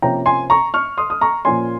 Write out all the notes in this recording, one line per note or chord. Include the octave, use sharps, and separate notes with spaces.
C3 F3 A#3 C#4 G5 A#5
G#5 C6
A#5 C#6
C#6 F6
C6 D#6
D#6
A#5 C#6
A#2 F3 A#3 C#4 G#5 C6